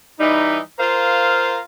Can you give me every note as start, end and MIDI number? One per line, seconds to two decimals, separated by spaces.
0.20 0.59 52
0.20 0.59 55
0.20 0.59 63
0.79 1.60 65
0.79 1.60 70
0.79 1.60 72
0.79 1.60 77